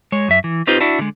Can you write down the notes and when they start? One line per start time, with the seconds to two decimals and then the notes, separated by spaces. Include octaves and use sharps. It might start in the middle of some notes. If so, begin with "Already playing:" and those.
0.12 G#3 C#5
0.28 F#2 E5
0.44 E3
0.67 C4 D#4 F4 G4 B4 C5
0.80 D4 E4 F#4
0.99 D3 G#3